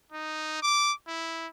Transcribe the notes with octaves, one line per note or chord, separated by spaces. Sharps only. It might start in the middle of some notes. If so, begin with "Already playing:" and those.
D#4
D6
E4